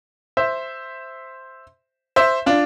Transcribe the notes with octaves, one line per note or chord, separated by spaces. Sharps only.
C5 E5
C5 E5
D4 F4